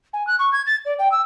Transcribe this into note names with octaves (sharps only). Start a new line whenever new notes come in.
G#5
F#6
C#6
G#6
A6
D5
G5
E6